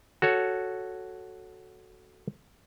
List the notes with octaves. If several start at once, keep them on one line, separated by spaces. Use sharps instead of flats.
F#4 A4 C#5